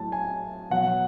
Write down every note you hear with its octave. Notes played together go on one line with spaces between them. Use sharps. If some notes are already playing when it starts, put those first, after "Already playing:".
Already playing: A2 F#3 A5
G#5
B2 F#3 F#5